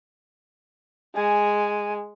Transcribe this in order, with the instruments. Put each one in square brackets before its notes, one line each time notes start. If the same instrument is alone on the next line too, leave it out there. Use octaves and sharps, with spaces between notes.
[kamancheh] G#3 [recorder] G#5